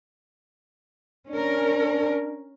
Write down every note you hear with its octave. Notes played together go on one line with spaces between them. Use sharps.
C#4 D4 A#4